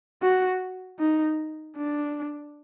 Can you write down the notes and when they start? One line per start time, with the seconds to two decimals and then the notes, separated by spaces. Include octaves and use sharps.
0.22 F#4
0.99 D#4
1.77 D4